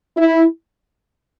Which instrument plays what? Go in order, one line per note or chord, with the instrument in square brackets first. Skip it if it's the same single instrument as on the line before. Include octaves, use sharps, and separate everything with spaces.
[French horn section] E4